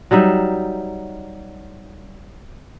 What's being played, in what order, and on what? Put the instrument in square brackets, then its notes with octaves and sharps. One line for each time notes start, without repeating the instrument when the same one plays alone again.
[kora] F#3 G3 D#4 E5